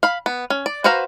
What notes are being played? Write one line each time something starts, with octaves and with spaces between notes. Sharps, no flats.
F5 B5
B3
C#4
D5
F#4 B4 C5 F5 A#5